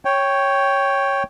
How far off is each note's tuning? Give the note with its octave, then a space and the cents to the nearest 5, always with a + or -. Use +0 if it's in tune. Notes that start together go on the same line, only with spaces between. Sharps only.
C#5 +0 G5 +0